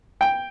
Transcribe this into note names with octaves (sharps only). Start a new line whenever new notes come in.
G5